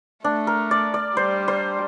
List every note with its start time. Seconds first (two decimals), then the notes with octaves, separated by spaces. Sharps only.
0.24 A3 D4
0.47 A#4
0.71 D5
0.94 D5
1.17 G3 C5
1.48 C5